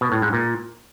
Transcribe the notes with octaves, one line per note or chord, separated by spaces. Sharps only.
B2
A2
G#2
A#2